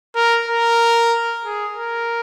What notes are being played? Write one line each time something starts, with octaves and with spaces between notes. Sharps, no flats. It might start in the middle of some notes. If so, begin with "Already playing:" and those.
A#4
A#4
G#4
A#4